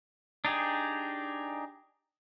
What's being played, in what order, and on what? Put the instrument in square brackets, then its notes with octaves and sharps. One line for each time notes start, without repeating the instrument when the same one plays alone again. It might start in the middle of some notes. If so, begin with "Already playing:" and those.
[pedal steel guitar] D4 D#4 G4 G#4